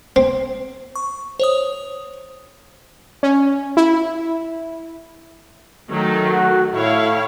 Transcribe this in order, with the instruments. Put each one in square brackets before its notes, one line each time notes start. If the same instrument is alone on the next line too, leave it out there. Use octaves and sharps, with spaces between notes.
[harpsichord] C4
[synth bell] C#6
C5 C#5 D#6
[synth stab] C#4
E4
[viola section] D#3 F#3 A3
[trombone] F#4
[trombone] A2 [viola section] E4 C#5 F5